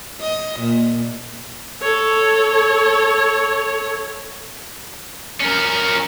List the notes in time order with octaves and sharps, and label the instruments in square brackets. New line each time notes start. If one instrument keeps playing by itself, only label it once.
[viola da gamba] D#5
A#2
[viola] A4 C#5
[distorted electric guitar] C#4 A#4